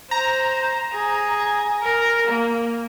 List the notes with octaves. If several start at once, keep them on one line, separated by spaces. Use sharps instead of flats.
C5 A#5
G#4
A#4
A#3